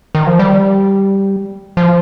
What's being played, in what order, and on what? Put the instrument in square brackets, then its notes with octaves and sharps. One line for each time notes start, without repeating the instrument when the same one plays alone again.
[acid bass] D#3
F3
G3
F3